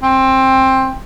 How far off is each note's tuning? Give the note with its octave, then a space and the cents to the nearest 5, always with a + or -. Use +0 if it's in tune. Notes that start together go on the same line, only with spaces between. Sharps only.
C4 +15